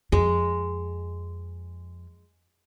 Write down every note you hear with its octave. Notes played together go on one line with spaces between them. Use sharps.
F2 G#3